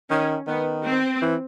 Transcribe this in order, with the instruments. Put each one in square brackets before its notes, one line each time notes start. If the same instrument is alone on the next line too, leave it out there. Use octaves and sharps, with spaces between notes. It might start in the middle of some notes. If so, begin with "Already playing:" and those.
[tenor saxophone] D#3 [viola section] C#4
[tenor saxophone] D#3 [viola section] B3
[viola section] C4
[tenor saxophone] E3